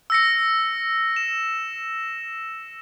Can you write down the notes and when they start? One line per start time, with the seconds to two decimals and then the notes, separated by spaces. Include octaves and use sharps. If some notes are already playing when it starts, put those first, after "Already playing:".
0.10 E6 A#6 C#7
1.16 E7